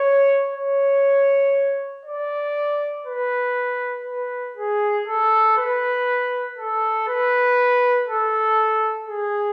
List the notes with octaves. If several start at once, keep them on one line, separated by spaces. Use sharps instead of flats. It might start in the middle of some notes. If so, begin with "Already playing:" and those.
Already playing: C#5
C#5
D5
B4
B4
G#4
A4
B4
A4
B4
A4
G#4